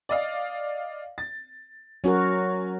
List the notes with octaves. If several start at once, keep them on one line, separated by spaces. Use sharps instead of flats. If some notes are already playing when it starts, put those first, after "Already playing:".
D5 D#5 F5
A6
F#3 C#4 F#4 A#4